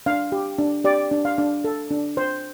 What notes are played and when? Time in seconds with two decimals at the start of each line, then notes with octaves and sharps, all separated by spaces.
0.06 D4 F5
0.32 G4
0.58 D4
0.84 G4 D5
1.11 D4
1.25 F5
1.38 D4
1.64 A4
1.91 D4
2.17 C5